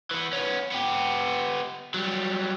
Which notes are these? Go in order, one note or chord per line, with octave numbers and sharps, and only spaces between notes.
E3 B3
B3 C#4
B3 G4
F#3 G3